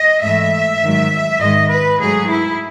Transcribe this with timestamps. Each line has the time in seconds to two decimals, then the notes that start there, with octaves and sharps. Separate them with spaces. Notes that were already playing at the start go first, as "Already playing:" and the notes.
Already playing: D#5
0.23 G#2 E3 A3 E5
0.83 G#2 D#3 F#3
1.40 G#2 D#3 G#3 D#5
1.71 B4
1.99 G#2 F#3 A3 G#4
2.30 E4